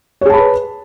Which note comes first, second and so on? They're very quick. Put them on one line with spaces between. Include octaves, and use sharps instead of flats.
C#5 G#4 A5 B5 B4